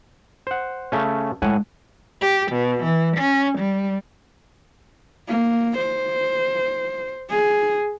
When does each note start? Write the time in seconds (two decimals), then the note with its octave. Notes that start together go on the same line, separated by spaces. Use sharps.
0.47 C5 F#5
0.92 C#3 A3 C#4
1.42 A2 G#3 F#5 G#5
2.21 G4
2.52 B2
2.83 E3
3.17 C#4
3.59 G3
5.29 A#3
5.78 C5
7.30 G#4